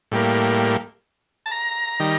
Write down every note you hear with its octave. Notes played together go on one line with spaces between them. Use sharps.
A2 G3 A#3
A5
A#5
D#3 G3